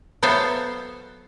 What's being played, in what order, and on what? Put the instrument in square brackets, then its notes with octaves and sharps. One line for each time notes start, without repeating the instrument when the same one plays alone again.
[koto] F#3 B3 A4 C5 E5 F5